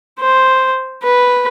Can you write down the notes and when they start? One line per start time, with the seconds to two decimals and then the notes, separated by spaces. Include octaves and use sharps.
0.19 C5
1.03 B4